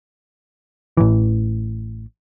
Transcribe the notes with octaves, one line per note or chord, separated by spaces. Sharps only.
A1 E3